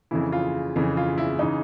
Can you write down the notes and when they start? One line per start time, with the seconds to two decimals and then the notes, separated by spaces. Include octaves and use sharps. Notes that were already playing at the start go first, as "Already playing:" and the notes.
0.11 F2 C#3 E3 E4
0.32 F4
0.76 F2 C#3 E3
0.97 F4
1.18 E4
1.39 C#3 E3 D#4